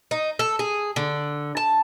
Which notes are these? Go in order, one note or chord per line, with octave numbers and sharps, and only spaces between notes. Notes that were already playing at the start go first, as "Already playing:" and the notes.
D#4
A4
G#4
D3
A5